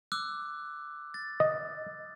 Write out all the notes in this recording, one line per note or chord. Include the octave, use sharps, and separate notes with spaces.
D6 E6 F#6
A6
D#5